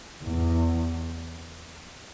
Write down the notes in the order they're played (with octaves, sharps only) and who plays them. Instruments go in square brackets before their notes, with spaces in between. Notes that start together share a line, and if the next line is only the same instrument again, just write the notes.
[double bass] E2